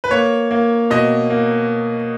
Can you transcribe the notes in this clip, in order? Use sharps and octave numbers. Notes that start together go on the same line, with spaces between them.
B4
A#3 C#5
A#3
B2 D#5
A#3